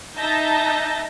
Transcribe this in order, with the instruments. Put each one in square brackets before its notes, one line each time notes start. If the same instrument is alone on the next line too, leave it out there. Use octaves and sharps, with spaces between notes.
[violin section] D#4 E5 A5 G6 A#6